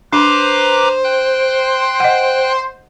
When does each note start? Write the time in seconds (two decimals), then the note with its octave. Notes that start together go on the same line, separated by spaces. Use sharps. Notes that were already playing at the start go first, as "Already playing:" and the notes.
0.13 D4 B4 C5 A#5 D6
1.04 G5 F#6
2.00 D#5 F#5